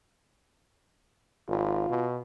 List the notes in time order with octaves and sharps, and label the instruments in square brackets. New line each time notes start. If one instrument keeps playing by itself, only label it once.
[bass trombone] G#1 [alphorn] F4
[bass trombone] B2